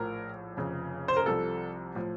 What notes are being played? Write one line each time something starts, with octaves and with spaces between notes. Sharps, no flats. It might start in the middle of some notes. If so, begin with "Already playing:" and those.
Already playing: A#1 A2 F3 A#4
F1 F2 C#3
C5
A#4
C2 C3 F3 A4
A2 F3